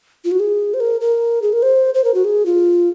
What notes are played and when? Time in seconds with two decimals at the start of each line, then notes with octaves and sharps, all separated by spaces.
0.25 F4
0.31 F#4
0.40 G#4
0.74 C5
0.80 A#4
1.01 A#4
1.42 G#4
1.53 A#4
1.63 C5
1.94 C5
2.04 A#4
2.14 F#4
2.24 G#4
2.46 F4